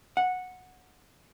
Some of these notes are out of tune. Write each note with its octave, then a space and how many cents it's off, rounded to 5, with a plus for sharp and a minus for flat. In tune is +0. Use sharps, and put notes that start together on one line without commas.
F#5 -10